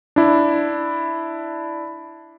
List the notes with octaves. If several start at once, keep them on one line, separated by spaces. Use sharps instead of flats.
D4 E4